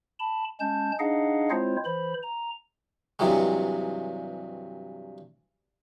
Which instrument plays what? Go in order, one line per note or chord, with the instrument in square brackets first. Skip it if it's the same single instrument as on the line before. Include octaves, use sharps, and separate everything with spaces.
[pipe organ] A5 B5
G#3 C#4 A5 G6
D4 D#4 G#4 D#5 F5 F#5
G#3 C4 E4 F4 C5 C#5
E3 C5 B5
A#5
[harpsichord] G2 C3 E3 F#3 G#3